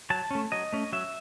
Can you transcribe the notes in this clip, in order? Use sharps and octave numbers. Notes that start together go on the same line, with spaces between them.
F#3 A5
A3 C#4
F#3 D#5
A3 C#4
F#3 E5